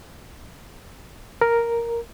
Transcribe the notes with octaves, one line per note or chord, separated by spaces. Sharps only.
A#4